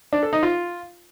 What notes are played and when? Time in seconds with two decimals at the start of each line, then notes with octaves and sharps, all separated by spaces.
0.13 D4
0.23 A4
0.33 D#4
0.43 F4